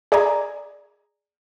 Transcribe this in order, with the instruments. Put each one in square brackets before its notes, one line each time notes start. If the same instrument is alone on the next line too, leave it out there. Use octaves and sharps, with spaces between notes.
[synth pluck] G#4 D5 D#5 G#5 A#5